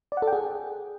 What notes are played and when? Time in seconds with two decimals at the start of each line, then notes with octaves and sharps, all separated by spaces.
0.12 D5
0.17 F#5
0.22 A4
0.27 G5
0.33 G#4